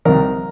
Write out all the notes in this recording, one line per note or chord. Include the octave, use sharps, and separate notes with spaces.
C2 C3 D#3 A#4